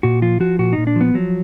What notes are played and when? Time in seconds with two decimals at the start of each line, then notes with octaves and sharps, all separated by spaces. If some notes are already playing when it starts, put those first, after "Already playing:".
0.03 A#2 F#4
0.22 F3 F4
0.40 F3 F#4
0.59 A#2 F#4
0.73 A#2 D#4
0.87 D4
0.96 F3 B3
1.14 F3 F#3